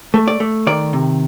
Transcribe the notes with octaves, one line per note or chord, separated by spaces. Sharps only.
A3
D5
A3
D#3 D5
C3